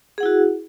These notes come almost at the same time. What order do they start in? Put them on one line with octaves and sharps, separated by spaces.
G#4 F#5 E4 F#4